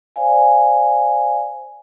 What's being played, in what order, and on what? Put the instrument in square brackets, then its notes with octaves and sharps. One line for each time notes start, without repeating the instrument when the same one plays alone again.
[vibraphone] C5 D5 F5 G#5